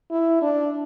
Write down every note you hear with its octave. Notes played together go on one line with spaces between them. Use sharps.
E4
D4